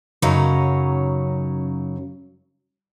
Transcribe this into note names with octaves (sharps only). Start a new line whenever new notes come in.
F#2 C#3 F#3 C#4 D#4 C#5